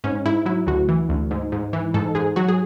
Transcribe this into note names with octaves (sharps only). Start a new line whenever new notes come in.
G#2 C#4
G#2 E4
F#3 E4
D2 F#4
E3
D2
G#2
G#2
E3
G#2 A4
G#2 G#4
F#3 F#4
G#4